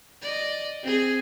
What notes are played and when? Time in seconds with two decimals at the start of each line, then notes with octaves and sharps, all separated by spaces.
0.22 D5 D#5
0.83 C4 G#4